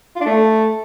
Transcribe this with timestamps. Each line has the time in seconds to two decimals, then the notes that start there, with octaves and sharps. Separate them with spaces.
0.16 F4
0.21 D4
0.26 A3